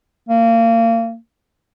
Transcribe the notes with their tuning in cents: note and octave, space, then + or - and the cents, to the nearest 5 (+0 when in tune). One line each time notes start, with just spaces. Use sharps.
A#3 -30